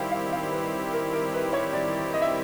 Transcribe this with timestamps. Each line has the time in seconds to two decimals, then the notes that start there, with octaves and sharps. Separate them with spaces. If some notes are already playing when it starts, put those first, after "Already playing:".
Already playing: D#3 G3 C4 E4 G4 F5
0.11 F5
0.33 F5
0.52 B4
0.93 A#4
1.13 A#4
1.34 B4
1.53 C#5
1.73 D5
2.14 D#5
2.22 E5